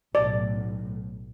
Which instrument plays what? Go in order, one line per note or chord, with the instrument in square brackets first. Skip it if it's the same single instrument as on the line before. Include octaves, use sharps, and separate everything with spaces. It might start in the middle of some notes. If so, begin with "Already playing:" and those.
[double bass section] B1 A2 [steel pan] D5